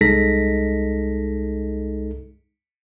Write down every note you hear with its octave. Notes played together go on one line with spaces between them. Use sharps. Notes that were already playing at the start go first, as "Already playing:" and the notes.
C2 G#3 D#4 A4 A#6 B6